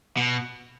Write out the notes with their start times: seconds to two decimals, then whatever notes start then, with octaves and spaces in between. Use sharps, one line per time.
0.17 B2